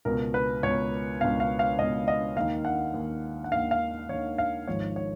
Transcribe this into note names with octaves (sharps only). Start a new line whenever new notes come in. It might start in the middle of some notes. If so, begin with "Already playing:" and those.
C#2 B2 A#4
B4
C#2 B2 C#5
C#2 B2 F5
F5
F5
C#2 B2 D#5
D#5
D#2 D#3 F5
F#5
D#2 D#3
F#5
D#2 D#3 F5
F5
D#2 D#3 C#5
F5
G#1 G#2 F3 C#5
C#5